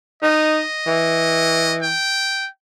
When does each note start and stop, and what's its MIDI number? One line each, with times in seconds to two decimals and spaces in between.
0.23 0.61 63
0.23 1.77 75
0.87 1.93 52
1.82 2.48 79